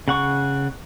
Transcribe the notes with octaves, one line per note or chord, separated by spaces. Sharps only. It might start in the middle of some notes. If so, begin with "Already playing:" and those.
C#3 F#5 C#6